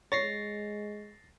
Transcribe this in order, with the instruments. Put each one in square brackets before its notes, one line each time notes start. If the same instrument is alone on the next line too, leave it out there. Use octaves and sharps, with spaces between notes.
[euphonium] G#3 [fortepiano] C#5 [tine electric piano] A6 A#6 C7